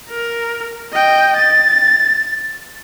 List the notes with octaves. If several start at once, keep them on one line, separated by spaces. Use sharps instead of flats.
A#4
D#5 G5
A6